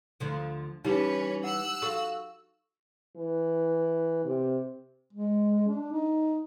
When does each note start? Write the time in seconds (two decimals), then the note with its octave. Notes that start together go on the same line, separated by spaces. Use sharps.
0.20 D2 D3 F3
0.85 E3 G3 C#4 D#4 G4 B4 D6
1.44 F#5 E6 F#6
1.82 F#4 A4 F5 C#6 D#6
3.17 E3
4.26 C3
5.13 G#3
5.68 D4
5.92 D#4